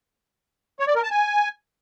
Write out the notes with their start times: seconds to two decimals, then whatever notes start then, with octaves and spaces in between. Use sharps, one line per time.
0.80 C#5
0.87 D5
0.95 A#4
1.03 A5
1.11 G#5